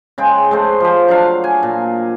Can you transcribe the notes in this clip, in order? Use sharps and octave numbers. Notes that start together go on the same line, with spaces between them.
C#3 G#3 G5
G#3 A3 C5
F3 G4
F#3 D4 F5
G#5
A#2